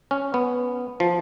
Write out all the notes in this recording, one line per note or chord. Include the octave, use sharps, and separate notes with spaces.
C#4
B3
F3